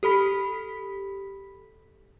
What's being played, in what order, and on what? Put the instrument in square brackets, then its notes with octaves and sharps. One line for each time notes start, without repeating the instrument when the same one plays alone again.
[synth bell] G4 A4 B5 B6